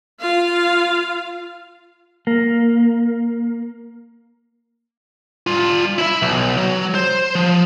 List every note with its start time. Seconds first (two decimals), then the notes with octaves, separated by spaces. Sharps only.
0.19 F4 F5
2.27 A#3
5.47 G3 F4
5.98 E4 E5
6.22 B1
6.57 F#3
6.95 C5
7.35 F3